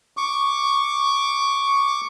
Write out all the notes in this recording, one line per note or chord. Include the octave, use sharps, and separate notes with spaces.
C#6 D6